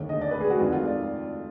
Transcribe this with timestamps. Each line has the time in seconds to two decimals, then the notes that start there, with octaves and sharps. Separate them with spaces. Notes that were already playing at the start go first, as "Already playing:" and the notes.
Already playing: D#2 D3
0.09 D#5
0.21 D5
0.31 B4
0.40 G#4
0.50 F#4
0.59 F2 D#3 F4
0.72 F4
0.85 D5